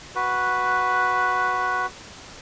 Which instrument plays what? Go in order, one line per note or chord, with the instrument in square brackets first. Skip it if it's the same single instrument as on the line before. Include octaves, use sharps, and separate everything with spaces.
[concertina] F#4 B4